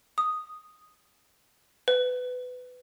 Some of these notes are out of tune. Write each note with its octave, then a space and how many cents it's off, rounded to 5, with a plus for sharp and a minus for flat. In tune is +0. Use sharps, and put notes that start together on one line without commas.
D#6 +0
B4 +20